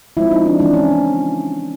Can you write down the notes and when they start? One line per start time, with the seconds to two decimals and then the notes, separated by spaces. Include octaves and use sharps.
0.17 F3 G#3 C4 E4
0.31 D#4
0.46 D4
0.60 E3 G#3 C4 D4
0.73 C#4